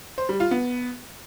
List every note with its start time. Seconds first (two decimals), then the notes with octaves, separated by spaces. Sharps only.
0.18 C5
0.29 G3
0.40 F4
0.51 B3